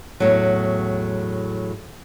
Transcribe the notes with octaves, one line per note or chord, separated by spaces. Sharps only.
E2 A2 F#3